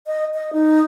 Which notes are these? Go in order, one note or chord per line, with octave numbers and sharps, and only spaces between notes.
D#5
D#5
D#4